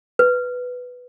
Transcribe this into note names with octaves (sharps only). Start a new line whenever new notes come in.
B4